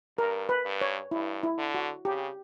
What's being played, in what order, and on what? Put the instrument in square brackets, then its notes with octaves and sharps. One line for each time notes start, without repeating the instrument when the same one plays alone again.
[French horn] G2 [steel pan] A#4
[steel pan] B4
[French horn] G2
[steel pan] C#5
[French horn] G2 [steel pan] E4
[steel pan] E4
[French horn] D3
[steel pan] F#4
[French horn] C#3 [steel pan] G4